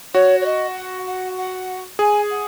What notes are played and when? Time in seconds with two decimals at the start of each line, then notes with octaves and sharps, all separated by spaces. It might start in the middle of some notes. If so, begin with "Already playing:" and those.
0.14 F#4 C#5
0.41 C#5
0.45 D#5
0.76 F#5
1.06 F#5
1.37 F#5
1.99 G#4 G#5
2.30 F#5